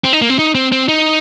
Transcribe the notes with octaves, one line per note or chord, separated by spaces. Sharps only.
C4
D#4
A#3
C4
D#4
C4
C4
D#4